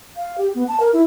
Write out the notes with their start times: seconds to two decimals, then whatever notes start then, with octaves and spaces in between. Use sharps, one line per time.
0.16 F5
0.38 G4
0.55 B3
0.68 A5
0.80 A#4
0.93 E4